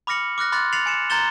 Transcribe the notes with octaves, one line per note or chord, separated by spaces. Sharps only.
B5 D6 F6 A#6 C#7 F#7
D6 F6 F#6 A#6
B5 C6 D6 F#6 A6 A#6
A6 C7 C#7 F7 F#7
G#5 C#7 E7
A#5 C6 G6 A6 E7 G7